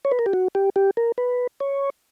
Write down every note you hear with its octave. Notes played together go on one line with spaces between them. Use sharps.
C#5
B4
A#4
G4
F#4
G4
G4
A#4
B4
C#5